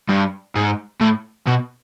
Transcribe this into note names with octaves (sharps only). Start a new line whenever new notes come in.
G2
G#2
A2
B2